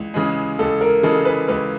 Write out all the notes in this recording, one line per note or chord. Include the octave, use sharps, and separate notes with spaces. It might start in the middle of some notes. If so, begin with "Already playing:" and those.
Already playing: C#2 E3
C#3 E3 G#3
C#2 A4
A#4
C#3 E3 G#3 A4
B4
C#2 B4